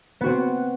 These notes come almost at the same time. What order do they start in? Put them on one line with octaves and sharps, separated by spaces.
B3 F#4 C4